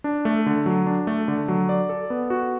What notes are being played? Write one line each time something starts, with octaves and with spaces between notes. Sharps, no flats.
D4
A3
D3
F#3
D4
A3
D3
F#3
D5
A4
B3
F#4